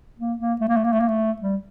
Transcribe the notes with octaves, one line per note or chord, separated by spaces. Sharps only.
A#3
A#3
A3
A#3
A3
A#3
A3
A#3
A3
G3